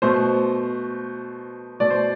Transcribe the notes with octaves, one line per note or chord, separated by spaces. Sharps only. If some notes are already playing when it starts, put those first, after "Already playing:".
B2 A3 C5
B2 A3 D5
C5